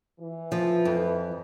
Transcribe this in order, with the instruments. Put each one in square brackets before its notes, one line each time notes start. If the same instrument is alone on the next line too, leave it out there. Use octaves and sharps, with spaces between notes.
[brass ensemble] E3
[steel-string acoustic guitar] F3
F2